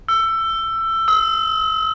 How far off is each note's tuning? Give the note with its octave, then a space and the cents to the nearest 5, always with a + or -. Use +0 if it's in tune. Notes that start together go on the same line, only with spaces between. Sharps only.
E6 +20
E6 -45